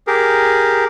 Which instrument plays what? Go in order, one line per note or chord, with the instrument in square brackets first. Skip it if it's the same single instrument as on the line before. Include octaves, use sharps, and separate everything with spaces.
[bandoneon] G4 G#4 A#4